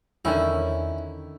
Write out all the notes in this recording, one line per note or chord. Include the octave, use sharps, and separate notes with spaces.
E2 D3 D#3 C#4 E4